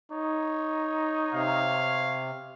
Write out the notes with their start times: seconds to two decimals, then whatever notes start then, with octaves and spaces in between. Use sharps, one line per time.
0.12 D#4 C#5
1.34 C3 F5